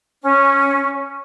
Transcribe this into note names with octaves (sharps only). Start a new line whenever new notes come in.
C#4